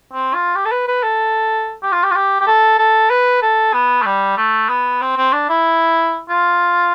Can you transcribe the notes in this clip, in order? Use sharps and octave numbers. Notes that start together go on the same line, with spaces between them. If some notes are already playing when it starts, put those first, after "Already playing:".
C4
F4
G4
A4
B4
B4
A4
G4
F4
G4
F4
G4
G4
A4
A4
B4
A4
B3
A3
G3
A3
B3
C4
C4
D4
E4
F4